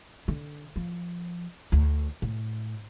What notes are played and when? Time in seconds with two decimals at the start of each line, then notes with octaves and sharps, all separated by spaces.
0.28 D3
0.76 F3
1.72 D2
2.22 A2